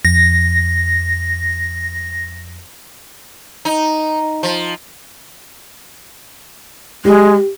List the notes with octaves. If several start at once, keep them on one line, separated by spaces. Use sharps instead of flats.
F2 A#6
D#4
F3
G#3 G4